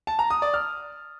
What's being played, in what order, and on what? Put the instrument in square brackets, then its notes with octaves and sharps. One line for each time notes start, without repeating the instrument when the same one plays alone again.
[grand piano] A5
A#5
D#6
D5
F6